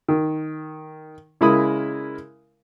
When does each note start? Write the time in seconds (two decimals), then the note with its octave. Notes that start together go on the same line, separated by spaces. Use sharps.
0.08 D#3
1.41 C#3 G#3 E4 A#4 B5 D#6